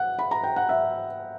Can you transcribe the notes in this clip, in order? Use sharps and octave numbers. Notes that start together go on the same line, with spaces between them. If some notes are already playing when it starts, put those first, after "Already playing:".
Already playing: F#5
B5
A#5
G5
F#5
E5